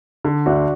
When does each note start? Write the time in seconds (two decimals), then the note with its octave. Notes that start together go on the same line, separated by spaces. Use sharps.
0.25 D3
0.46 D2 D4 F#4